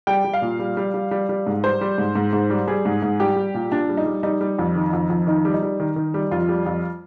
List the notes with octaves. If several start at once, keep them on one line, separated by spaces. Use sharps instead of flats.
G3 G5
G3
F5
A#2
G3
G3
G3
G3
G3
G#2
G3 C5
G3
G#2
G#2
G#2
G3
G3 G#4
G#2
G#2
G3 G4
G3
A#2
A#2 D4
G3
D#4
G3
G3 D#4
G3
F2
D#3
F2
F2
D#3 D#4
G3
D#4
G3
D#3
D#3
G3
F2 F4
G3
F2